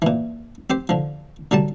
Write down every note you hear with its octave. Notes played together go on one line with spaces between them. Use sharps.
A#2 E3
C4 G4 C5
D3 F3
D3 F#3 G3 A5